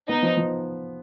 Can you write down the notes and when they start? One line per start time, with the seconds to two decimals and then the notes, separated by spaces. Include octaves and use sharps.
0.09 B3 D#4
0.23 F3
0.37 F3